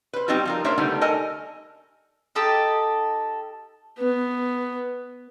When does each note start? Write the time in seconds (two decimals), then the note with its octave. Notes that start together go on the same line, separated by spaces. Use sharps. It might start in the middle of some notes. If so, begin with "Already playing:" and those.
0.13 B4 C5
0.28 G3 C4 D#4 F4 F#4
0.45 F3 F4 A#4
0.64 A#3 D4 A#4 C5 C#5 E5
0.78 D3 G3 A3 B3 D#4
1.01 A4 A#4 D#5 G#5
2.35 D#4 G4 A4 D#5
3.98 B3